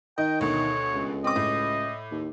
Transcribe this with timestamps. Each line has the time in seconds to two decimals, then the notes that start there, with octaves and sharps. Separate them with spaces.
0.18 D#3 D#5 G5
0.41 D2 B2 C#5
0.94 C#2
1.24 C4 D#5 D6
1.36 A2
2.11 D#2